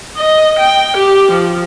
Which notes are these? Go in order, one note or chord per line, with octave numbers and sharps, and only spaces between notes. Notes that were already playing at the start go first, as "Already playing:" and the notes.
D#5
G5
G4
F3